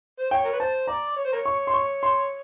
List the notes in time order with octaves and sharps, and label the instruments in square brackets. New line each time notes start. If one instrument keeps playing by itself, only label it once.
[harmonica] C5
[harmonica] C#5 [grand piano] G5
[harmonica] A#4
B4
[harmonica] C5 [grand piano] A5
[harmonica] D5 [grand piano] A#5
[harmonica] C#5
C5
A#4 C#5
[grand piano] C#6
C6
C#6
C6